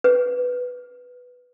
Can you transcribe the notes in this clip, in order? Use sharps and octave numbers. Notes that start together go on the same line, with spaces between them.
B4